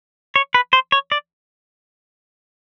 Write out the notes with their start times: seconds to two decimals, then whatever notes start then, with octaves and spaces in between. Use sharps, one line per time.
0.36 C#5
0.54 B4
0.73 C5
0.92 C#5
1.12 D5